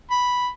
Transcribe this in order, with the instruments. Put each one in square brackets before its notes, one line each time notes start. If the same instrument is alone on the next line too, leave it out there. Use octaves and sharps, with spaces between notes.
[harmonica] B5